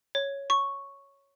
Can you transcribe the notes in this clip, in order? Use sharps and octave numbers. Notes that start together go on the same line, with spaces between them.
C#5
C#6